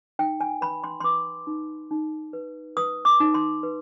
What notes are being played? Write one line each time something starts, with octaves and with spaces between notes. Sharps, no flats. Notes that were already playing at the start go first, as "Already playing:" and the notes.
D#4 G5
G#5
B4 B5
C6
C6
B4 D6
D#4
D#4
B4
B4 D#6
D6
D#4
C6
B4